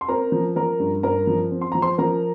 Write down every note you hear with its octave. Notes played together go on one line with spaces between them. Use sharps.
C6
C4 A#4 A#5
F3
F3 A#4 A#5
G2
G2 A#4 A#5
F3
C4
C6
F3 A#5
C5 C6
F3 A#4 A#5